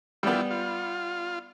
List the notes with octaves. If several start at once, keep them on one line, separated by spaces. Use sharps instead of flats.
G3 B3 E4 F4 G4
F4